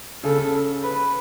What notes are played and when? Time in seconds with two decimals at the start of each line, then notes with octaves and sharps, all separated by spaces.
0.24 C#3 A4
0.83 B4